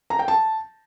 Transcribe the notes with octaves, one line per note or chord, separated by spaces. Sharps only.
A#5
G5
A5